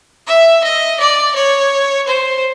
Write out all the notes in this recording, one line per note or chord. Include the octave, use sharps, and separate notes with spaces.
E5
D#5
D5
C#5
C5